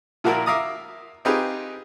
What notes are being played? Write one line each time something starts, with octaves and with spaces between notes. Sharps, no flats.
A#2 F3 A#3 E4 F#4 A#4
E5 F5 A#5 D6 D#6
C4 D#4 F4 G4 G#4 B4